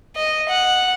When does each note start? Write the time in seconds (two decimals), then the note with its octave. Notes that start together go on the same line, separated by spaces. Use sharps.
0.16 D#5
0.49 F#5